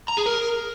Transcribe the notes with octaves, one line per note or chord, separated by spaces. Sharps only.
A#5
G#4
A#4